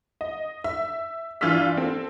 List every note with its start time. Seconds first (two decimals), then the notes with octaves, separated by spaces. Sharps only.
0.21 D#5
0.64 E5
1.41 G2 E3 F4 E5 E6 B6
1.77 C4 A4